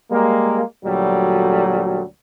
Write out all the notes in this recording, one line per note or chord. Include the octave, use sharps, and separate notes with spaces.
G3 G#3 A#3
D2 A#2 F#3 G3 A4